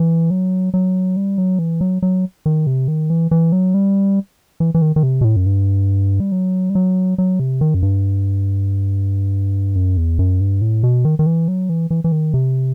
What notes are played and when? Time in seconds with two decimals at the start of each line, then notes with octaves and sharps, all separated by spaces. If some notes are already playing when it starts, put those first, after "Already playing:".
Already playing: E3
0.30 F#3
0.74 F#3
1.16 G3
1.38 F#3
1.59 E3
1.81 F#3
2.02 F#3
2.46 D#3
2.67 C3
2.88 D#3
3.10 E3
3.31 E3
3.52 F#3
3.74 G3
4.60 E3
4.74 E3
4.82 D#3
4.96 D#3
5.03 C3
5.21 B2
5.24 A2
5.36 F#2
5.46 G2
6.20 G3
6.32 F#3
6.70 G3
6.75 F#3
7.18 F#3
7.40 C3
7.61 D#3
7.74 F#2
7.82 G2
9.76 F#2
9.97 E2
10.19 F#2
10.41 G2
10.61 A2
10.83 B2
11.05 D#3
11.19 D#3
11.26 E3
11.48 F#3
11.69 E3
11.91 E3
12.04 E3
12.12 D#3
12.34 C3